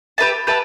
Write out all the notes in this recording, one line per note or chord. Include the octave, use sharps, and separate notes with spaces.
G4 B4 E5 A5
G4 B4 E5 A5